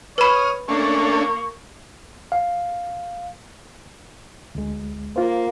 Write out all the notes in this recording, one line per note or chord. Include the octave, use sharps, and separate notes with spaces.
B4 C#5 B5 D#6 F6
A3 A#3 C#4 D4 C#6
F5
D2 G#3
A#3 F4 A#4 C5